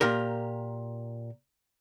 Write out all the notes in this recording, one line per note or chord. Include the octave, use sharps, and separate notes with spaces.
A#2 G4 A#4